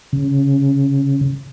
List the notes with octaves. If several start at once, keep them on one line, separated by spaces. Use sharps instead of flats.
C#3